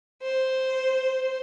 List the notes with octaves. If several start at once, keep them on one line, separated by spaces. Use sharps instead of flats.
C5